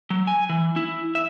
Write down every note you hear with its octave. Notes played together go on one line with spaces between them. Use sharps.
F#3
G#5
E3
E4
E5